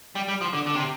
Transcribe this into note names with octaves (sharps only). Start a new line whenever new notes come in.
G3
G3
F3
D3
D3
C3